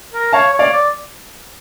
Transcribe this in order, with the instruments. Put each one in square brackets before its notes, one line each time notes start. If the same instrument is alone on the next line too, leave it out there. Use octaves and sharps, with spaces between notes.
[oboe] A#4
[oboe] C#5 [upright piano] F5 A5
[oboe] C#5
[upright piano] D5 F5
[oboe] D5